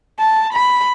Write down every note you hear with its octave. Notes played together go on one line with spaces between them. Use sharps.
A5
B5